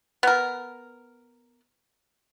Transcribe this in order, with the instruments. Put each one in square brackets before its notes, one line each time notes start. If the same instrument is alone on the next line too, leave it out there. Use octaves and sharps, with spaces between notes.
[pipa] B3 A#4